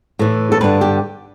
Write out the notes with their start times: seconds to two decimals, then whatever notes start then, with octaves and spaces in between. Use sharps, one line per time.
0.19 A2 E3
0.52 A4
0.61 G2 D3 B4
0.81 G4